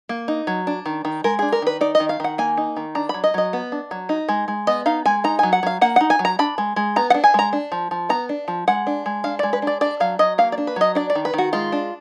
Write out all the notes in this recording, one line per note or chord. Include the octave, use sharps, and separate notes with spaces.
A#3
D#4
F#3
D4
D#3
D#3
G#3 A#4
D4 G#4
A#4
D#3 B4
D#4 D5
D#5
D#3
F5
D#3 F#5
A#3 G#5
D#4
D#3
D4 A#5
F#3 B5
D#5
F#3 D#5
B3
D4
F#3
D#4
G#3
G#3
B3 D#5
D#4 F5
G#3 G#5
D#4 A#5
F#3 G#5
F#5
F#3 F5
A#3 F#5
D#4 F#5
G#5
F#3
A#5
D4 B5
G#3
G#3
B3 A#5
F#5
D4
G#5
G#3 A#5
D4
F3
F3
B3 A#5
D4
F3
G#3 F#5
D4
G#3
D4 F5
G#3 D5
B4
D4 D5
D4 D5
F#3 F5
F#3 D#5
A#3 F5
D5
D4
B4
F#3 D#5
D4 D5
D5
D#3
B4
D#3 F#4
G#3 F4
D4